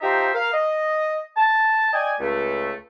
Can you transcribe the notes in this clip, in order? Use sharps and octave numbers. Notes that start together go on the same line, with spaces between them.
F3 D#4 G4 C5 E5 A#5
A#4 F5
D#5
A5
D5 D#5 G5 G#5
C#2 A3